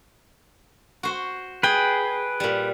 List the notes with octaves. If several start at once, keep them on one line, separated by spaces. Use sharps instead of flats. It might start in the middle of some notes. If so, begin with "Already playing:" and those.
F#4 C5
G#4 B4 G5
A#2 G3